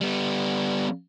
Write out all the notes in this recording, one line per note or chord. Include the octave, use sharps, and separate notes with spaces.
G3 B3